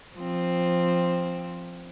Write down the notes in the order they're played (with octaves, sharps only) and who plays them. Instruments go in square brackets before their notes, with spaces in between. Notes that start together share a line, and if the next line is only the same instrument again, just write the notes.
[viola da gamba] F3 C4